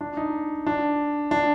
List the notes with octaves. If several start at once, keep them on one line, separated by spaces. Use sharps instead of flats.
D4
D#4
D4
D4